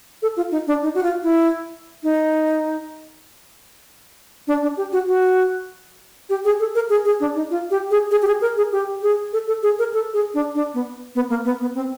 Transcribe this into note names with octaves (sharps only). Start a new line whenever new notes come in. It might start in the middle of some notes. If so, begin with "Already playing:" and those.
A4
F4
D#4
D4
D#4
F#4
F4
E4
D#4
D4
D4
G4
F#4
F#4
G4
G#4
A4
A#4
G#4
G#4
D4
D#4
F4
G4
G#4
G#4
G4
G#4
A#4
G#4
G4
G#4
A4
A4
G#4
A#4
A4
G#4
D4
D4
B3
B3
A#3
B3
B3
C4